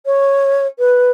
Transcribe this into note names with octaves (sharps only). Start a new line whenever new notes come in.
C#5
B4